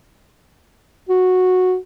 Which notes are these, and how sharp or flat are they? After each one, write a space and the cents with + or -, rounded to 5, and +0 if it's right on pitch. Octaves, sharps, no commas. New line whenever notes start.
F#4 -10